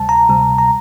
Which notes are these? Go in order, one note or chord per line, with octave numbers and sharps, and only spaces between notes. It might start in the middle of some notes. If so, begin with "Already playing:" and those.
Already playing: D2 C3 G3 A5
A#5
D2 C3 G3
A#5